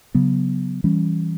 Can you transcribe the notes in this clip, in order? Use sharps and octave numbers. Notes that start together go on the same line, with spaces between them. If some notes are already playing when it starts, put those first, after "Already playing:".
C#3 F#3 B3
E3 G3 C#4